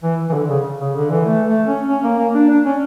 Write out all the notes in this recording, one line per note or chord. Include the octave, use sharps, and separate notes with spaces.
E3
E3
D3
C#3
C#3
D3
E3
A3
A3
C#4
C#4
A#3
A#3
D4
D4
C#4